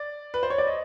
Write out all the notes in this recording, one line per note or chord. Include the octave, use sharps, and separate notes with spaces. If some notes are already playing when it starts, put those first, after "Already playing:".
Already playing: D5
B4
C5
C#5
D5
D#5